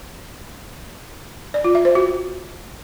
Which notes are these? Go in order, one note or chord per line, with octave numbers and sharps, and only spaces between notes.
D5
F4
E5
C5
F#4